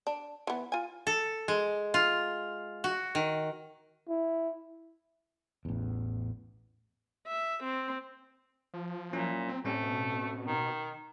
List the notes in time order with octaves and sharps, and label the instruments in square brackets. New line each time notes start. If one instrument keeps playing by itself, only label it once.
[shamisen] D4
E3 B3
F4 G#5
[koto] A4
G#3
F4
F#4
D#3
[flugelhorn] E4
[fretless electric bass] A1 E2
[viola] E5
C4
[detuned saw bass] F3
[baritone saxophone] A#2 [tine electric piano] F#3 C#4 E4
[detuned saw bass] C4
[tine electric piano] A2 C4 C#4 [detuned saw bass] G3 [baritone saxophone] A3
[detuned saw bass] B2
[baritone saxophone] D#3